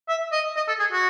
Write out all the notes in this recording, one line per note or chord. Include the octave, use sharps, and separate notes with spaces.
E5
D#5
D#5
A4
G#4
F#4